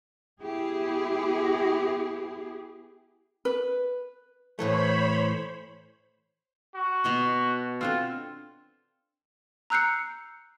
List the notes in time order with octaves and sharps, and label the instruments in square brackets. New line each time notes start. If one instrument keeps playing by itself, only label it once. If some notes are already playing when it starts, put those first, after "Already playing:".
[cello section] B3 E4 G4 G#4
[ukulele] B4
[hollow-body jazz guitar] A2 E3 A3 [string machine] C5 C#5 B5
[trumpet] F#4
[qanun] B2 D#5 C6
[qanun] C4 D4 A4 [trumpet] F4
[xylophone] A#5 E6 F#6 G6 C7 C#7